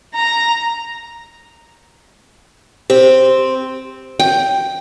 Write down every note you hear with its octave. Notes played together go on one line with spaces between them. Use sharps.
A#5
C4 G4 C5
G5